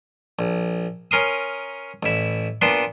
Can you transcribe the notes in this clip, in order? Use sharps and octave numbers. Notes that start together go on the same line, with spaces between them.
A#1
C#4 A#4 C6 D#6
A1 E4
A#2 B3 D4 C6